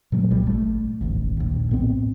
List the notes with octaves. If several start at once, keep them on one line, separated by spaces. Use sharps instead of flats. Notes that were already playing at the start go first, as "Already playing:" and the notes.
A#2 F#3 G3 A3
B1 A#2 G3
G#1 A3
E1 A1 D#2
A#1 D#2
A2 B3 C4